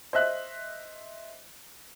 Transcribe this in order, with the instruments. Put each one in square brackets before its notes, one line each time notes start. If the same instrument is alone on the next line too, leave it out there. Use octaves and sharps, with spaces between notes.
[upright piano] C5 D#5 E5 F#6